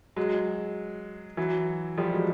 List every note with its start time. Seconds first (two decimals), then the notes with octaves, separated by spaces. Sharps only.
0.16 F#3 G#3
1.37 E3 F#3
1.98 F3 G3
2.12 F#3 G#3